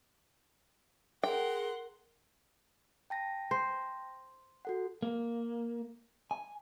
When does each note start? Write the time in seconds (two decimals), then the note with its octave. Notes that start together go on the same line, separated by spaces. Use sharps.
1.24 G#4 A#4 F#5 G5 C6
3.10 G5 A5 A#6
3.51 C5
4.65 F#4 A4 F#5
5.02 A#3
6.31 G#5